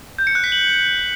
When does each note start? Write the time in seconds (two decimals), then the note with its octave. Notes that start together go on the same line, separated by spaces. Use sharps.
0.18 G6
0.27 C#7
0.35 F#6
0.44 B6
0.52 F#7